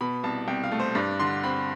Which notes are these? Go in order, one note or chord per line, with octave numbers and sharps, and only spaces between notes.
B2 B5
C2 A5
C2 G5
F5
A3
C5
G2 D5
D3 C6
C4 B5